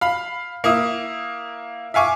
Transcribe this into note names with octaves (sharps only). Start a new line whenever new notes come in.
F5 B5
A#3 E4 D#6
E5 F5 G#5 C#6 D6